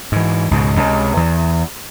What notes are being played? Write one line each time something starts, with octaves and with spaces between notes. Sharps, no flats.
G#2 E3
C#2 G#2 B2
C#2 C3
E2